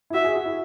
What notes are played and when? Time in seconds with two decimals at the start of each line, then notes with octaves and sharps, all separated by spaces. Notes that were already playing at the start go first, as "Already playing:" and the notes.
0.10 E4
0.14 F#4 E5
0.25 G#4
0.36 F#4
0.46 E4